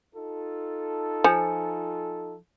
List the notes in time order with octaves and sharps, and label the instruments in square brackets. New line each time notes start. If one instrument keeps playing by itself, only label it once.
[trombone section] D#4 F4 A4
[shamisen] F3 [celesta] G#5 C#7